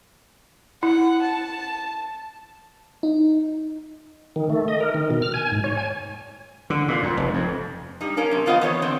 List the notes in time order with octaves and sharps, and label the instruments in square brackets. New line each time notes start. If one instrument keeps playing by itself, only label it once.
[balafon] E4 [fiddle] F#5
[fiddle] A5
[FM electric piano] D#4
[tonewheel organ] D#3
A3
D#5
A#4
D#3
B2
F6
G#5
G#2
C#5
G#5
[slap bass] D3
A#2
F2
F1
F2
[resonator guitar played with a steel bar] G3 D#4
A#3 C#4 A#4
F#2 C3
F2 B3 F4 C5 D#5 F#5
E2 B3 C#5 D#5
D3 B3 C4